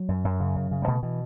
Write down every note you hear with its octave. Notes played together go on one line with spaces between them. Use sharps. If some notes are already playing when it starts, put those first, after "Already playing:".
Already playing: F#3
F#2
F#2
C#3
F#2
C#3
G3
B2 A3
B2 E3